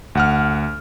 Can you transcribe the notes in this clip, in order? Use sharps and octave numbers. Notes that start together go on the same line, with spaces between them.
D2 F#5 F6